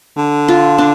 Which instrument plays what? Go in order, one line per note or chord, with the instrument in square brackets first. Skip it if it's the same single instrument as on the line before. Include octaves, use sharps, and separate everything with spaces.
[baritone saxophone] D3
[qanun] F4
D4